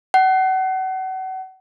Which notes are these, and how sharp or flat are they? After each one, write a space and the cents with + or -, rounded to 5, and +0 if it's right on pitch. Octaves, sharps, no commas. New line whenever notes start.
F#5 +35